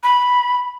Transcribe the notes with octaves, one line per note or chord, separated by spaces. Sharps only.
B5